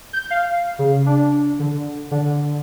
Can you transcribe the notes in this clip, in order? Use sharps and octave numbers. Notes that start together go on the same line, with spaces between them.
G6
F5
C#3
D4
D3
D3